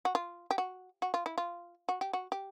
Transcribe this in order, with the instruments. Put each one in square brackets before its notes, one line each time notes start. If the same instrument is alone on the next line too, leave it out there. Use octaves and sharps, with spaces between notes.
[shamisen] F#4
F4
G4
F#4
F#4
F4
E4
F4
F#4
G4
F#4
G4